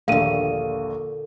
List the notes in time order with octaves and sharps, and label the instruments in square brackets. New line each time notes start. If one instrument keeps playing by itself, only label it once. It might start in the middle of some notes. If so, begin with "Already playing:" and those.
[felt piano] A#1 D#2 [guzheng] A#2 D3 [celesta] F5 D#7